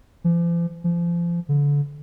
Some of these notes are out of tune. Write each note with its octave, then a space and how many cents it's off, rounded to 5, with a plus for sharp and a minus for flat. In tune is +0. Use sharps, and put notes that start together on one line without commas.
F3 -45
F3 -30
D3 -30